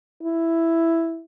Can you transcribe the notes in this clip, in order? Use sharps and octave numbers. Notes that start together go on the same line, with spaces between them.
E4